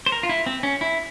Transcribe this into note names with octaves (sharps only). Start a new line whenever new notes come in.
C5
A#4
F4
E4
C4
C#4
E4